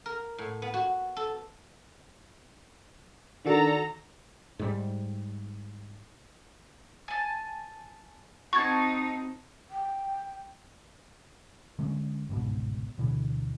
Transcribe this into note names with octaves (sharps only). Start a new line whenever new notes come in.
A#4
A2
B3
F#4
A4
D#3 D4 F#4 A4 A#5
G#2 G3
G#5 A5
C4 D#4 F#4 A5 C#6 G#6
G5
D3 G#3 C#4
G1 C#2 G#2 B2
D2 B2 D3 E3